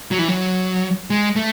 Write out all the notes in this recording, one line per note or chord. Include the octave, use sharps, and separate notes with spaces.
F#3
E3
F#3
G#3
A3